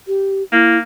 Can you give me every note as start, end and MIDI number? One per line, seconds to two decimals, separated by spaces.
0.07 0.42 67
0.52 0.80 58
0.52 0.78 64